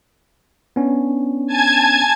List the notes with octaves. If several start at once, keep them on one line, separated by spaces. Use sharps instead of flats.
B3 C#4 D4
G#5 A5 G#6